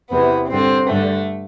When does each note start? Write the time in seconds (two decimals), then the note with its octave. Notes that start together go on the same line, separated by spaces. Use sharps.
0.10 E2 C3 E3 B3
0.50 G2 D3 C4
0.89 G2 D3 A3